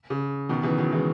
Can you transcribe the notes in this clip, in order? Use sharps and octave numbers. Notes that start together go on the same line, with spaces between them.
C#3
B2 D#3
C#3 E3
D#3 F#3
E3 G#3